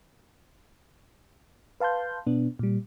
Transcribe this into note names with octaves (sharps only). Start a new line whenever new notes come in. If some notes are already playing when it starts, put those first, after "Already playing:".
B4 F5 A5 C6 G6
B2 B3 D4
A#2 G3